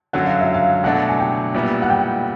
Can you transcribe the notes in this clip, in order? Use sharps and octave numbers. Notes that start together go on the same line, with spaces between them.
F#2 D3 F#3 F#5
F5
E5
F5
B2 F#3 A3 D4 F#5
G#5
G5
A#2 G3 B3 E4
F#5
G5